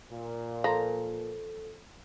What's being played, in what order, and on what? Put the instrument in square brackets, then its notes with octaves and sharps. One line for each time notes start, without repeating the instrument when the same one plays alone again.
[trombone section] A#2
[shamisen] F3 [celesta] A4 [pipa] A#5